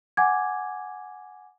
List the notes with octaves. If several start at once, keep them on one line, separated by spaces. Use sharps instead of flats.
F#5 G#5 D6 G#6